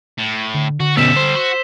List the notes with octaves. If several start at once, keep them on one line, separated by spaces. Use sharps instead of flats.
A2
D3
D3 F#4
B2 G3 B3 C#4 A4 E6 B6 E7
C5
F#4